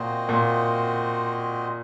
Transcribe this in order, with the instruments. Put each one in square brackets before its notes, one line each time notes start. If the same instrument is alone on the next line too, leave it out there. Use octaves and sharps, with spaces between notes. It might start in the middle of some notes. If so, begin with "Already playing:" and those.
Already playing: [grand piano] A#2 [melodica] C4 F#4 C5 D#5
[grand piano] A#2